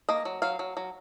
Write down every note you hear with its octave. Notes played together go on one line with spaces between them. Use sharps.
A#3 D#5
F#3
F#3 F5
F#3
F#3